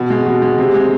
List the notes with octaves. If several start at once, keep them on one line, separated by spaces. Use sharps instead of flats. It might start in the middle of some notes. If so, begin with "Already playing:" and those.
Already playing: B2
G#3
B2
G#3
C3
G#3